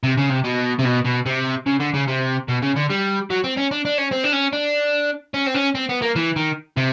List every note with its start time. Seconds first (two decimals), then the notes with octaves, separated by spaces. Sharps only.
0.03 C3
0.17 C#3
0.30 C3
0.44 B2
0.79 C3
0.85 B2
1.05 B2
1.26 C3
1.66 C#3
1.80 D3
1.94 C#3
2.07 C3
2.48 B2
2.62 C#3
2.76 D3
2.90 G3
3.30 F#3
3.44 C4
3.57 C#4
3.71 D4
3.85 D4
3.98 C#4
4.11 C4
4.24 D4
4.32 C#4
4.53 D4
5.34 C#4
5.47 C4
5.54 C#4
5.75 C4
5.89 B3
6.02 A#3
6.16 E3
6.36 D#3
6.77 C3